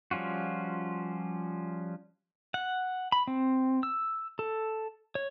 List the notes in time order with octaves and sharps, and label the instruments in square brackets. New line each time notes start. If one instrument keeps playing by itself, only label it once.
[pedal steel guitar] F3 G3 C#4 F4 F#4
F#5
B5
C4
E6
A4
C#5